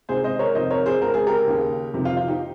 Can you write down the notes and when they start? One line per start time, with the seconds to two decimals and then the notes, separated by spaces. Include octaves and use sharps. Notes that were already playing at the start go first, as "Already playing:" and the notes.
0.09 C#2 C3 D#3 G#4 C5
0.24 C5 D#5
0.39 A#4 C#5
0.55 F2 C3 D#3 C5 D#5
0.70 A#4 C#5
0.86 G#4 C5
1.01 C#2 C#3 A#4
1.14 G#4
1.27 G4 A#4
1.47 D#2 C#3
1.94 F2 C3 D#3
2.05 F4
2.17 F4
2.28 D#4 G4